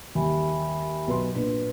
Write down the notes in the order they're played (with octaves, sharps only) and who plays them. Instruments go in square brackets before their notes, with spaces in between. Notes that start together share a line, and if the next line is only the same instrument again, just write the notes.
[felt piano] D#2 G3 [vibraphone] E5 G#5 B5
[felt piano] B1 B4 C6
[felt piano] A#2 D4 [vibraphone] B4